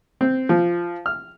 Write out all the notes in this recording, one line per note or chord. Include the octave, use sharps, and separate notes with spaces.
C4
F3
F6